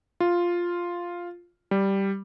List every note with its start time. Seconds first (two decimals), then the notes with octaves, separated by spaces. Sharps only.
0.20 F4
1.71 G3